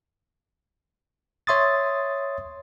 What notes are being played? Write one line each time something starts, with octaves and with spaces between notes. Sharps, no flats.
C#5 E5 C6 D#6 A6